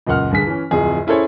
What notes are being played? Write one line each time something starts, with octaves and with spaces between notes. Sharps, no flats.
C#2 F#2 A#2 F#5 F6
G2 D3 G#4 B6
E3 C#4
D1 F2 G#4
C#4 E4 G#4 A4 C5 C#5